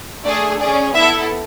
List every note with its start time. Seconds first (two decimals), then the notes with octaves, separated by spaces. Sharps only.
0.24 A3 D4 G#4 D5
0.59 C#4 G#4 D5
0.94 B3 E4 A4 E5